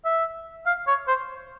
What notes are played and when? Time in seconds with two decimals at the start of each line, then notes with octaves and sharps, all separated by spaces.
0.05 E5
0.66 F5
0.88 C#5
1.08 C5